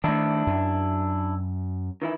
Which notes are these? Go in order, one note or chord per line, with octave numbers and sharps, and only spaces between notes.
D#3 A3 D4 E4
F#2
D#3 E3 E4